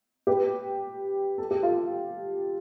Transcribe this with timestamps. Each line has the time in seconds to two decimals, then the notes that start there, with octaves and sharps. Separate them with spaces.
0.27 G4 B4
1.38 A4
1.51 G4
1.62 F4 A4